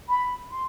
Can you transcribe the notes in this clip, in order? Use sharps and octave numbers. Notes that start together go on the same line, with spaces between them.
B5
C6